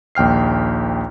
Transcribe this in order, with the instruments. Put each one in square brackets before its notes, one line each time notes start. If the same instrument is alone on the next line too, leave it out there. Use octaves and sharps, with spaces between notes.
[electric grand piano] A#1 D#2 G5 F6 C7